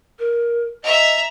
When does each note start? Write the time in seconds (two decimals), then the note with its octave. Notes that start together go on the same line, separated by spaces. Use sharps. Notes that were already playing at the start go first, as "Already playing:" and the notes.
0.19 A#4
0.84 D#5 E5 A#5